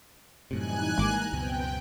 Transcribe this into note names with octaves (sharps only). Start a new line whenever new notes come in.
F#2 A2 C3 E3 G3 D#4 G#5 F#6
G#1 G#3 A#3 A#5 D6
C#2 F#2 B2 B3 C4 G5